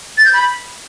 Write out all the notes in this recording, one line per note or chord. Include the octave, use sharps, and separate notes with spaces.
A6
G6
B5